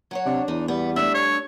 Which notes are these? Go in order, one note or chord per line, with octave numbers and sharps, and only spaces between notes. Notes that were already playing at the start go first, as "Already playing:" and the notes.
F#3 F#4 C#5
C3 D4
E2 D#4
G3 B3
A3 D4 E5
C#5